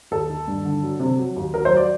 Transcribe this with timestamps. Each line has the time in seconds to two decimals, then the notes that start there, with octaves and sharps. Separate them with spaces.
0.11 D#2 A4
0.29 D#3
0.48 G2
0.65 D3
0.83 F#3
1.00 C3
1.18 F#3
1.36 D#2
1.54 F#3 A#4
1.65 C5
1.71 F#3
1.77 D5